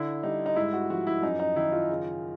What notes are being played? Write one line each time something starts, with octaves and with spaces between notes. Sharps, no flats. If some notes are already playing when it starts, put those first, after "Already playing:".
Already playing: D3 E4
G3 D#4
D#4
G#2 E4
F#4
F3 F#4
E4
F#2 D#4
D#4
D#3 E4
F4
C#3